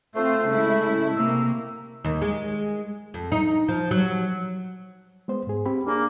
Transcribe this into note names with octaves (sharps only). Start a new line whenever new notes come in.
A3 C4 F4 C5
C#3 G#3 E4
C3 A#3 E6
D#2
G#3
F2
D#4
F3
F#3
G#3 B3 C5
G#2 G#4
C4 G4 B5
A#3 D4 G#4